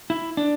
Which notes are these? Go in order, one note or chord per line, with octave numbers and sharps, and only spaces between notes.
E4
D4